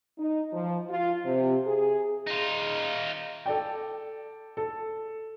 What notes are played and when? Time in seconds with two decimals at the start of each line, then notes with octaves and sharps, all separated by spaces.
0.19 D#4
0.53 F3
0.90 F4
1.25 C3
1.67 G#4
2.27 D#4 F4
3.46 A4 D5 G5
4.57 A4